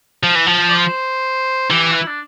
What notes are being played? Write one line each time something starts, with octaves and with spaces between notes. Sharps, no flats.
F3
E3
F3
D5
C5
E3 G4
G4
E4
D4